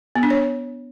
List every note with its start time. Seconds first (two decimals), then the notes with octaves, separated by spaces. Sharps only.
0.16 B3
0.23 D4
0.30 C#5